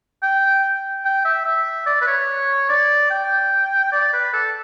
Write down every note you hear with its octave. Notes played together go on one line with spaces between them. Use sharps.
G5
G5
E5
E5
D5
B4
C#5
D5
G5
D5
B4
A4